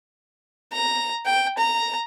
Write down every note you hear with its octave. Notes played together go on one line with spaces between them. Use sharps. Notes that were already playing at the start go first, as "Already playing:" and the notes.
A#5
G5
A#5